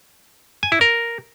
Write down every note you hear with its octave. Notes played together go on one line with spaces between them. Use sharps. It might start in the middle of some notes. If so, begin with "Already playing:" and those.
G#5
E4
A#4